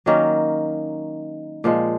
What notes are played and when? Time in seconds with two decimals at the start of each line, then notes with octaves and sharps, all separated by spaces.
0.06 D#3 F#3 A#3 C#4
1.64 A#2 F3 G#3